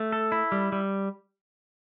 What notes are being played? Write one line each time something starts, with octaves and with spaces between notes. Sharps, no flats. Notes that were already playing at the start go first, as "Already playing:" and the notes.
Already playing: A3
A4
E4
G3
G3